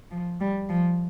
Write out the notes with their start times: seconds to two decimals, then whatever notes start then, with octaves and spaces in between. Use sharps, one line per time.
0.11 F3
0.41 G3
0.69 F3